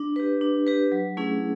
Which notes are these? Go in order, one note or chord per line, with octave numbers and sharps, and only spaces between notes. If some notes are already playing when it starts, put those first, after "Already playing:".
Already playing: D4
G4 B4
D4
G4 B4
F#3
A3 C#4 E4 G#4